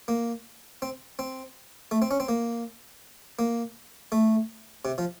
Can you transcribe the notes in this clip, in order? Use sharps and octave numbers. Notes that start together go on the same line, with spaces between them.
A#3
C4
C4
A3
C4
C#4
C4
A#3
A#3
A3
C3
F3